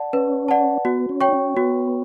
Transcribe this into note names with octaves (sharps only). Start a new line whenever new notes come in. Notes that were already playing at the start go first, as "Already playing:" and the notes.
Already playing: D5 F#5 A5
C#4 B4
D5 F#5 A5
B3 F#4
C#4
C#5 G5 C#6
D4
C#4
B3 F#4